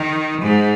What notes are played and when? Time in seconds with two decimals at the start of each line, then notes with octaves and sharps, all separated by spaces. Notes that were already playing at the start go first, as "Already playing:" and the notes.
Already playing: D#3
0.42 G#2